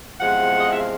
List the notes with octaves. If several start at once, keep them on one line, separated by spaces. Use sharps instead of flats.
E2 C3 F3 G#3 F#5
D#5
E5
F5